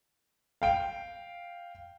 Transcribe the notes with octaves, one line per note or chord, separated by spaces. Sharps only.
F5 G5 D7